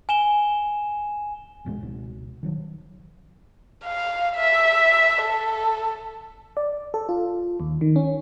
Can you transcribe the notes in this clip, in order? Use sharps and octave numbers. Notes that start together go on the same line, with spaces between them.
G#5 E7 G7
A#1 E2 B2 G#3
C#2 B2
D#3 E3 F#3
F5
E5
A4
D5
A4
F4
D#2
D#3
C#4